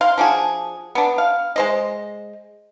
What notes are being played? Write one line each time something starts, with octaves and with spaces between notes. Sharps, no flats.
F5 C6
F3 D4 F#4 G#4
B3 D4
F5
G#3 C5 D#5